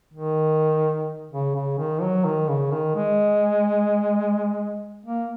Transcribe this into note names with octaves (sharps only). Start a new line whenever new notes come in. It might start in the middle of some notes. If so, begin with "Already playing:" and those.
D#3
C#3
C#3
D#3
F#3
D#3
C#3
D#3
G#3
A#3